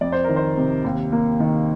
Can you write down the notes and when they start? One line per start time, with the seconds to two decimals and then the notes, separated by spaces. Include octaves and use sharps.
0.01 F2 D5
0.12 C5
0.24 D#3 A#4
0.36 C5
0.57 C3
0.84 D#2
1.12 A#3
1.40 D#3